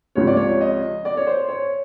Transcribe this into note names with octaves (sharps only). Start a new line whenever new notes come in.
C#2 C3 F3 C#5
D5
C#5
D#5
D5
C#5
C5
C#5